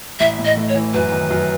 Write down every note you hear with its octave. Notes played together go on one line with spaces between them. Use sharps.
A1 E5
A2
D#5
A3
C#5
E3
F#2 B4
D#3
F#2